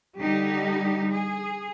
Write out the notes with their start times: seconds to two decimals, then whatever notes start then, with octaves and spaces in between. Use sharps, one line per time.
0.18 D3 G3 D#4 G4
1.09 G#4